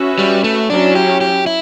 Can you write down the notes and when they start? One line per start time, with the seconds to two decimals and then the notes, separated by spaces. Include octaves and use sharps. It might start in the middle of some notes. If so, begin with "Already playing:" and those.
Already playing: C#4 F#4 B4 E5
0.19 G3
0.44 A3
0.69 F#3 C#4 D4 E4
0.95 G4
1.21 G4
1.46 E4